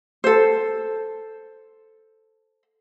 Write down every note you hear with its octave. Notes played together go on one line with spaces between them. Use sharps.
A4 C5